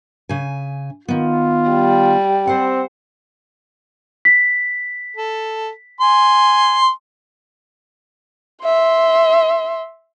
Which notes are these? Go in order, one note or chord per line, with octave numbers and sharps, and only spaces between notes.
C#3 G#5
D#3 B3 F4
G3
C4 C5 F#5
B6
A4
G#5 C6
E5 C6